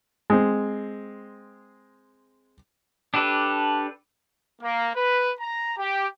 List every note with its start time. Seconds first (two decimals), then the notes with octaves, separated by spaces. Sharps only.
0.30 G#3 C4
3.14 D4 G4 A4 B4
4.62 A#3
4.95 B4
5.40 A#5
5.78 G4